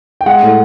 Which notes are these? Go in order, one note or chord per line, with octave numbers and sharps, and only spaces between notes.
G5
G#3 F#5
A2